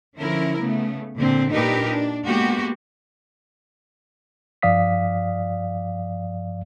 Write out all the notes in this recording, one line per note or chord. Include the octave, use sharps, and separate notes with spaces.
D3 F3 C#4 E4 A#4
C#3 A3 B3
A#2 D3 C4
A#2 D4 D#4 G4 A#4 B4
D4
G#3 A#3 B3 F#4 G4
G2 F3 D5 F5 D#6 B6